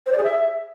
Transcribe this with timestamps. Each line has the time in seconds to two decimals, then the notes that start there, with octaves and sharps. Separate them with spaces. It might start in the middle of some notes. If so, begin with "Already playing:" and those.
0.06 C5
0.12 D5
0.17 G#4
0.23 E5